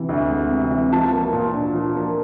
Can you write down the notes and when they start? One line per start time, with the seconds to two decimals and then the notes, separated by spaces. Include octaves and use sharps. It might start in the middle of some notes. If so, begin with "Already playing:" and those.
Already playing: C3 E3
0.09 D2
0.30 G#3
0.50 C3
0.71 E3
0.92 F3 A5
1.12 A#3
1.33 A#2
1.54 D4
1.74 F3
1.95 A#3